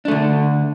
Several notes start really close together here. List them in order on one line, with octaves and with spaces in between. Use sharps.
D4 A3 D3